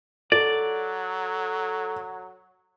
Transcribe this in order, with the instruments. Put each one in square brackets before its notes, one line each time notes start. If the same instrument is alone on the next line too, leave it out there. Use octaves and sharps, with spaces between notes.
[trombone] F#3 [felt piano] A4 [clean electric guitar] D5